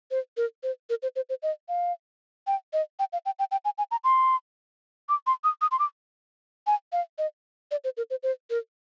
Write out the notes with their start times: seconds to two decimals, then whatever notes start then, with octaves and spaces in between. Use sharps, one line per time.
0.11 C5
0.37 A#4
0.63 C5
0.90 A#4
1.02 C5
1.16 C5
1.29 C5
1.43 D#5
1.69 F5
2.47 G5
2.73 D#5
2.99 G5
3.13 F5
3.25 G5
3.39 G5
3.51 G5
3.65 G#5
3.78 G#5
3.91 A#5
4.04 C6
5.09 D6
5.27 C6
5.44 D#6
5.61 D#6
5.71 C6
5.79 D6
6.67 G#5
6.92 F5
7.18 D#5
7.71 D5
7.84 C5
7.97 A#4
8.10 C5
8.23 C5
8.50 A#4